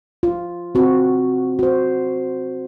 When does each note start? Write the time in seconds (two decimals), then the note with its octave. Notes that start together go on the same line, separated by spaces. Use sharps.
0.23 F4
0.75 C4 F#4
1.59 F#4 C5